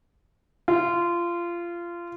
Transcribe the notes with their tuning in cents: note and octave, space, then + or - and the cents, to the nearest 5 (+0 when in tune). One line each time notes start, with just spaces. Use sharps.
F4 -20